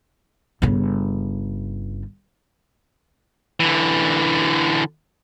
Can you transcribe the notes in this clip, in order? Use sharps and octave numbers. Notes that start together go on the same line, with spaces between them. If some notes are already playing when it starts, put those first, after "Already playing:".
G1 C#3
D3 E3